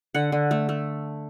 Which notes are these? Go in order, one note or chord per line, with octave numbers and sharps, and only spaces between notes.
D3 F#5
D3
A3
A3